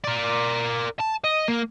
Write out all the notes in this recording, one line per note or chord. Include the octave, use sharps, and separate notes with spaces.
A#4 D5
A5
D#5
A#3